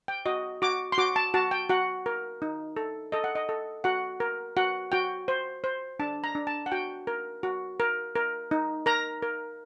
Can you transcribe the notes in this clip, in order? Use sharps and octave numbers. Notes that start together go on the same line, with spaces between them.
G5
F#4 D#5
F#4 D6
C6
F#4 D6
A5
F#4 A5
G5
F#4 F#5
A#4
D#4
A4
A4 D#5
F#5
D#5
A4
F#4 F#5
A#4
F#4 F#5
F#4 G5
C5
C5
D4 A5
A#5
D4
A5
F#5
F#4 G5
A#4
F#4
A#4
A#4
D#4
A#4 A#5
A#4